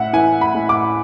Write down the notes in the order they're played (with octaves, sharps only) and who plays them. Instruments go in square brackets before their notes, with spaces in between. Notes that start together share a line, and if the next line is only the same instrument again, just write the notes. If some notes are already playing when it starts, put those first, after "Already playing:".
Already playing: [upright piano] A2 E5 F#5
E3 G#5
B5
A2
D6